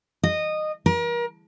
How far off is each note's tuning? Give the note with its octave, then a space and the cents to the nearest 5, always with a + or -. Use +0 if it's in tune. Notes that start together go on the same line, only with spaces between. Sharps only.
D#5 -15
A#4 +35